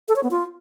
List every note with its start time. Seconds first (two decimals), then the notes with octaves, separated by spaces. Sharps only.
0.08 A4
0.16 C#5
0.23 B3
0.31 F4